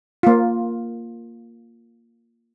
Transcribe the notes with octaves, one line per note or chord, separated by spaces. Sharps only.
A#3 F4